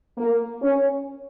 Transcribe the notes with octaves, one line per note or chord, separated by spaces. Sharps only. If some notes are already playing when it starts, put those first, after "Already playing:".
A#3
C#4